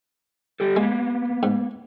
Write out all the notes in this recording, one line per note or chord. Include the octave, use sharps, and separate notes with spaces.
G3 G4 A4
G#3 A#3 B3
G#2